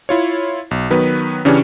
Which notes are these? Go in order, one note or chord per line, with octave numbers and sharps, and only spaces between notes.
E4 F4 C#5
B1
D#3 F#3 B3 B4
C#3 E3 C#4 D4 G4 C#5